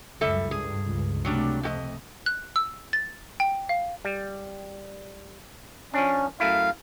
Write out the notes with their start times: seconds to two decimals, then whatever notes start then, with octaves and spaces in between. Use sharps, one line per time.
0.21 C#2 F#2 G3 A4 E5
0.51 G2 G#4
0.85 C#2 G2
1.25 C3 F#3 G3 A3 D4
1.63 F2 F#4 D#5
2.26 F#6
2.56 E6
2.93 A6
3.40 G5
3.69 F5
4.05 G3
5.94 F3 C#4 D4
6.40 F#2 A3 E4 F5